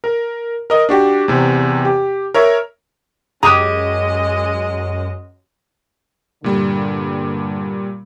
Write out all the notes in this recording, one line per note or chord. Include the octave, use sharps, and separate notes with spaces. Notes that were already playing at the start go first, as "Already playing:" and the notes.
A#4
A#4 D#5
D4 F#4 G4
E2 C3
G4
A#4 C#5 E5
F#2 G#3 G4 G#4 D#5 A#5 D#6 F#6
G2 A#2 D3 G3